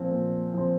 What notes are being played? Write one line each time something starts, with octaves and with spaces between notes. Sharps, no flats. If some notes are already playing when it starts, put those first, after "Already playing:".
Already playing: A#2 F3 C4
A#2
F3 C4